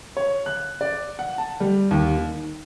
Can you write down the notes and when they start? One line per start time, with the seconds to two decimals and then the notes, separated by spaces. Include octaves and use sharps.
0.17 C#5
0.46 F#6
0.81 D5
1.19 F#5
1.38 A5
1.60 G3
1.91 D#2
2.17 D#3